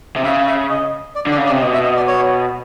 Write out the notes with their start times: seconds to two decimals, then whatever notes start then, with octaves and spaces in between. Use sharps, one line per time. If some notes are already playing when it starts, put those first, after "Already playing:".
0.16 C3
0.24 C#3 E5
0.47 E5
0.70 D#5
1.15 D5
1.27 D3 D5
1.38 C#3
1.46 D5
1.50 C3
1.61 B2 D#5
1.74 E5
1.85 D#5
1.96 D5
2.07 C#5